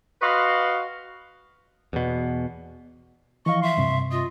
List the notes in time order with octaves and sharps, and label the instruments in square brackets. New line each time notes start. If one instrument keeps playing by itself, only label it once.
[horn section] F#4 B4 D#5 F5 C6
[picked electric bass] E2 B2
[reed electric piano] E3 F3 F5 [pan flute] D#5 [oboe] C#6
[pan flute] E5 [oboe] C6
[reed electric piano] G2 C3
[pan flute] F4 [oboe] D#5